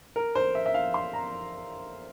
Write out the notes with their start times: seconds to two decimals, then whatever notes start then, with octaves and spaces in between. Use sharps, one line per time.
0.16 A#4
0.35 C5
0.55 E5
0.66 E5
0.74 F5
0.94 C6
1.13 A#5